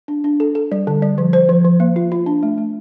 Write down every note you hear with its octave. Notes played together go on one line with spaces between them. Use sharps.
D4
D4
A4
A4
G3
D3
G3
F3
C5
F3
F3
A#3
F4
F4
D4
A3
A3